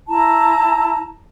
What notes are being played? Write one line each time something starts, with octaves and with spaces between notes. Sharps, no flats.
E4 A5 A#5